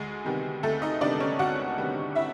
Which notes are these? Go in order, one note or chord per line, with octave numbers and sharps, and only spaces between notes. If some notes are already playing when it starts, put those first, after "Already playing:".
Already playing: D2 G#3 G#4
C3 D#3 G3 B3
D2 A3 A4
D#4 D#5
C3 D#3 G3 B3 D4 D5
C#4 C#5
D2 F#4 F#5
C3 D#3 G3 B3
E4 E5